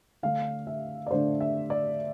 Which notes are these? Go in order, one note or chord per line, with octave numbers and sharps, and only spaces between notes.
D3 A3 D4 F5
E5
D5
D3 A3 D4 C5
E5
D5